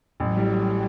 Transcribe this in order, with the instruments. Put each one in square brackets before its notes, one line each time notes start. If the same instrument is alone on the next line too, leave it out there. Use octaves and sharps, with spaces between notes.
[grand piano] A1 [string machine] F#3
[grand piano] A2 G3